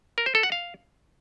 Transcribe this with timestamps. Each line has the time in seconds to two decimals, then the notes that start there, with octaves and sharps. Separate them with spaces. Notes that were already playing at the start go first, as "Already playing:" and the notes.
0.18 A#4
0.26 C5
0.35 A4
0.43 F#5
0.52 F5